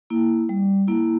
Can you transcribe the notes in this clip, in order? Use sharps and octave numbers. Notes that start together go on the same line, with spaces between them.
A#3 E4
G3
A#3 E4